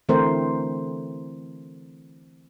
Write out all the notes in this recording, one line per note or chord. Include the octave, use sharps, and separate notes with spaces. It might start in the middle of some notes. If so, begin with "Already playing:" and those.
D3 E3 A3 C4 A#4 C5